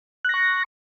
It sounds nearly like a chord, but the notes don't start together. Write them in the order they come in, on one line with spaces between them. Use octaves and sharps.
F#6 A#6 C#6